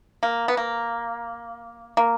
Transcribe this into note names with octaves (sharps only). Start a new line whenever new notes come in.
A#3
B3
A#3
A#3